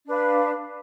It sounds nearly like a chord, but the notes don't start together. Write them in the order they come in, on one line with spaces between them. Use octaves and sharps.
D4 B4 F5